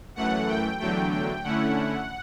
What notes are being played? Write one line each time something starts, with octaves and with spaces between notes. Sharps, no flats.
F#2 E3 A3 F#5
G5
E2 D3 F#3 A3 G5
G5
D3 A3 C#4 E4 F#5